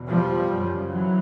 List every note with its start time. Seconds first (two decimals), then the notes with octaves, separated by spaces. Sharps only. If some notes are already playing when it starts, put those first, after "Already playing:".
Already playing: E2 B2
0.09 F3 G3
0.49 F#2 C#3
0.90 E3 F#3